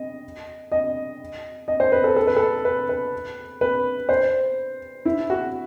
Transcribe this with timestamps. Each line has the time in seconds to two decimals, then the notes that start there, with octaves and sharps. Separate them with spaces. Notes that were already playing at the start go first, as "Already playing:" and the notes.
Already playing: D#5
0.72 D#5
1.68 D#5
1.80 C5
1.92 B4
2.04 A4
2.16 A4
2.27 B4
2.36 A4
2.65 B4
2.89 B4
3.61 B4
4.09 C5
5.05 E4
5.30 F#4